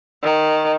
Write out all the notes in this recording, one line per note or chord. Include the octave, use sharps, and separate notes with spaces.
D#3